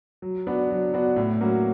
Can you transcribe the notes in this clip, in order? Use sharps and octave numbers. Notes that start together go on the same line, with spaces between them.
F#3
B3 D4 F#4
F#3
B3 D4 F#4
A2
F#3 A#3 C#4 F#4